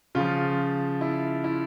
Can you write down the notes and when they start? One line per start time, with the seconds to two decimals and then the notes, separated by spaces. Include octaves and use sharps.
0.15 C#3 F3 F4
1.01 E4
1.44 E4